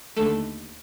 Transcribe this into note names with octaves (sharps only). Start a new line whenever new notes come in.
D#2 D3 A3 A4